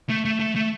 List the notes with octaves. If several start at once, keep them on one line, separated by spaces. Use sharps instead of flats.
A3
A3
A3
A3